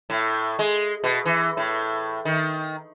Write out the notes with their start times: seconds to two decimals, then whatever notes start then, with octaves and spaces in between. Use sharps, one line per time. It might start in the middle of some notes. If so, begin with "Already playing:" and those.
0.10 A2
0.59 G#3
1.04 B2
1.26 E3
1.57 A2
2.25 D#3